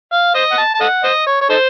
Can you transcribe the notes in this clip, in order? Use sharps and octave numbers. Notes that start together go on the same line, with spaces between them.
F5
C5 D#5
F#5
A5
A5
A4 D#5 F#5
C5 D#5
C#5
C#5
D#4 A4 C5